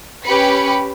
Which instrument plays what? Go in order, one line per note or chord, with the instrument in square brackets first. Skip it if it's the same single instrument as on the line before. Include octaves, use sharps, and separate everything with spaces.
[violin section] C#4 G4 B4 B5 C#7